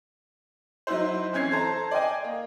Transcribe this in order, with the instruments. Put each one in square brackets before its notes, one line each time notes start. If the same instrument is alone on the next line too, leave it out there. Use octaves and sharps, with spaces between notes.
[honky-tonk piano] F#3 D#4 E4 C5
E3 C4 C#4 G#6 C7
A4 C5 A5 A#5
D5 D#5 G5 G#5
A#3